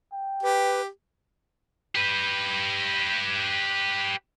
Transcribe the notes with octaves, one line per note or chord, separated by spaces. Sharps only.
G5
G4 B4
G4 B4